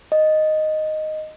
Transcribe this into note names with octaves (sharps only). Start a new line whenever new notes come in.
D#5